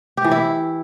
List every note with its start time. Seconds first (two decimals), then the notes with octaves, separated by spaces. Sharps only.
0.17 G4
0.24 E3
0.31 E4